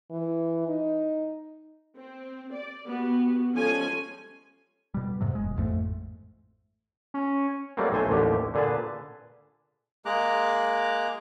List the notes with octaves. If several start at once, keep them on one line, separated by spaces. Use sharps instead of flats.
E3
D#4
C4
D5
B3 F#4 G4
F3 G3 G#3 C#4 A4 G#5
B2 G3
F2 G#2 C3 F#3
E1 G#3
A1 F2 G#2 A3
C#4
F#3 G3 A3 A#3 C4
B1 A3 C5 G#5
A1 D#2 D3 G4
A#2 D3 G#4 B4 A5
G#3 A#3 G#4 A#5 D6 F#6